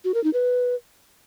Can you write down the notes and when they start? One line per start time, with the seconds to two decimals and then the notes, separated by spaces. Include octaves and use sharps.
0.04 F#4
0.14 A#4
0.24 D#4
0.33 B4